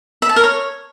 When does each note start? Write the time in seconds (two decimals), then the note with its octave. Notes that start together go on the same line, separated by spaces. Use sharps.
0.22 E5
0.29 A5
0.36 A#4
0.44 C#5